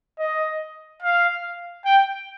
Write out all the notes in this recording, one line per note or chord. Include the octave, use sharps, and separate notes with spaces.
D#5
F5
G5